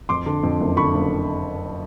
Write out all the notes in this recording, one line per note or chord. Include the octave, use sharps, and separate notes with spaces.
F2 C6 D6
D3
F2
F#1
D3 B5 C#6
F#1